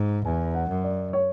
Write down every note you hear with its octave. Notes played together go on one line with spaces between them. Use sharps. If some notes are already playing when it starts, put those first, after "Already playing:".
Already playing: G#2
E2 G#5
F#5
F#2
D5
C#5